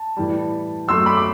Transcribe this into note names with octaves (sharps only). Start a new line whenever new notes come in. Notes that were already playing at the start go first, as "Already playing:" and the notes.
Already playing: A5
A2 E3 G3
F#2 F#3 A3 C6 E6
B5 D6
D6